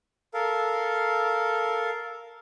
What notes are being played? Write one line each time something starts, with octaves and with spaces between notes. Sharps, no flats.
A4 A#4 F5